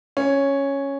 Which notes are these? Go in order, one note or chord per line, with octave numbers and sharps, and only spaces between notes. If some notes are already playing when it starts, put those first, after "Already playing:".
C#4